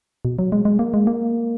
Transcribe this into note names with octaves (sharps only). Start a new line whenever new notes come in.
B2
F#3
G#3
G#3
A#3
G#3
A#3